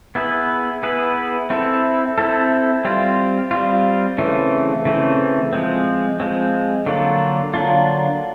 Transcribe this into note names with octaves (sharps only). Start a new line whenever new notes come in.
B3 E4 G#4 B4
B3 E4 G#4 B4
C4 E4 A4
C4 E4 A4
G3 C4 F4
G3 C4 F4
C#3 E3 A3 C4
C#3 E3 A3 C4
F3 G#3 C4
F3 G#3 C4
D3 F#3 A#3 D4 F4
D3 F#3 A#3 D4 F4